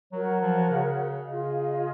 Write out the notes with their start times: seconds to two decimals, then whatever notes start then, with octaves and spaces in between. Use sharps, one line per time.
0.12 F#3 F#4 A#4 C#5
0.41 F3
0.70 C#3
1.27 C#3 F4 G#4 D#5